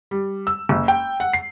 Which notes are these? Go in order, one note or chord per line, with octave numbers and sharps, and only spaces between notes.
G3
E6
F#1
G5
F#5
C7